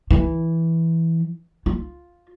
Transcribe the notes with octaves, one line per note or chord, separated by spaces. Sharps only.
E3
F4